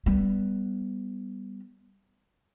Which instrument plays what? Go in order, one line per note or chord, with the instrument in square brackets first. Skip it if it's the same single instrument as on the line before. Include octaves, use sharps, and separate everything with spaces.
[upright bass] G3 B3